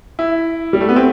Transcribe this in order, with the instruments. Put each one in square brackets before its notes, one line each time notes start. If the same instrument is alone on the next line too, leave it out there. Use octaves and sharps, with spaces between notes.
[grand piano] E4
G3
A3
B3
C4